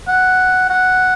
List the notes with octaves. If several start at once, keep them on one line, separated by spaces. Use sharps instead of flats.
F#5
F#5